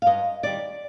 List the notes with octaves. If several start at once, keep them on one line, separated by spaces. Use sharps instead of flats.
F5
G2 D#5
D#3 G3 D5